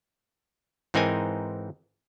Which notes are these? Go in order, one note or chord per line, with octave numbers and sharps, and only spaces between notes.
G#2 E3 C4 D#4 A#4 G#5